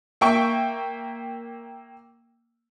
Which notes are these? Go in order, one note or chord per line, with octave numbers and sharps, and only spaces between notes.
A#3 E5 G5 C#6